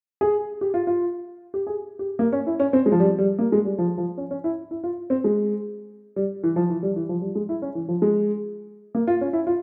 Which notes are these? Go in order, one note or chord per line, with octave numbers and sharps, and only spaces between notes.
G#4
G4
F4
F4
G4
G#4
G4
A#3
C#4
E4
C#4
C4
G#3
F3
G3
G3
A#3
G#3
G3
F3
F3
C#4
C#4
E4
E4
F4
C4
G#3
G3
E3
F3
E3
G3
E3
F3
G3
G#3
E4
C#4
E3
F3
G#3
A#3
F4
C#4
E4
F4